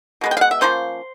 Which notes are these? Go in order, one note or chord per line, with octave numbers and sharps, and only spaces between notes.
B2 G#3 B3
G5
F5
F#5
E5
F3 A#3 C#4 C5